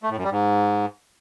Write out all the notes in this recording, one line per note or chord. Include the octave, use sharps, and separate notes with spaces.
A3
A2
F#2
G3
G#2